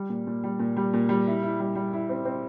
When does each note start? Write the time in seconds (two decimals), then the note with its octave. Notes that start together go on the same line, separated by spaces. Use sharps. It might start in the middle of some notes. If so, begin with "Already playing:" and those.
Already playing: G3
0.09 A#2
0.27 A#2
0.44 G3
0.59 A#2
0.77 G3
0.93 A#2
1.09 G3
1.27 E4
1.43 E4
1.60 G3
1.75 G3
1.93 E4
2.09 C4
2.25 C4